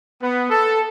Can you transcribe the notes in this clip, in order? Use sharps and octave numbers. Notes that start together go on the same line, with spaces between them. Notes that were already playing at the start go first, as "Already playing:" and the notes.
B3
A4